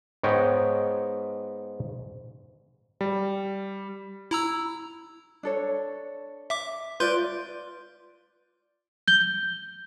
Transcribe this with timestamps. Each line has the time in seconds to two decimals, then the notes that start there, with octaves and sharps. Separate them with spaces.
0.23 G#2 B3 C#5 D#5 G5
3.01 G3
4.31 E4 A#5 E6
5.43 D4 A4 C#5
6.50 E5 D6
7.00 F4 B4 D5 C6 G6
9.08 G6 G7